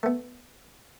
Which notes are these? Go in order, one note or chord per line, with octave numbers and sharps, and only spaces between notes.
A3 B3